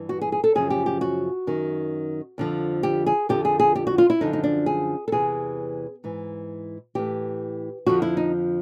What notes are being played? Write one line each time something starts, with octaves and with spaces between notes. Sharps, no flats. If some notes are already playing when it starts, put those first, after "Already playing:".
Already playing: G2 E3
F#4
G#4
G#4
A4
F#2 C#3 F3 G#4
G4
G4
F#4
F#2 D#3
F2 D3 F3
G4
G#4
F2 D3 F3 G4
G#4
G#4
G4
F#4
F4
E4
F#2 D3 F3 D#4
D#4
D4
G#4
A4
E2 C3 E3 G#4
G#2 E3
A2 E3 G4
F2 D3 F3 F#4
E4
D#4